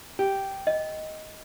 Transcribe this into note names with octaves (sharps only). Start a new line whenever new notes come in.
G4
D#5